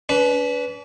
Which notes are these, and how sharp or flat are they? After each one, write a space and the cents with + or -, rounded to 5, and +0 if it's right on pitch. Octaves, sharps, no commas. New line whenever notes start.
D4 -45 B4 +0